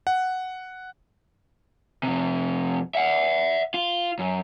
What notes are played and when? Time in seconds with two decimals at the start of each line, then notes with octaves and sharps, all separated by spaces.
0.07 F#5
2.03 F2 C3
2.95 E5 F#5
3.74 F4
4.19 F#2